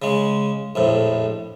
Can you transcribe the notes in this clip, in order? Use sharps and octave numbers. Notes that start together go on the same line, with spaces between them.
C#3 G#3
A#1 F2 A2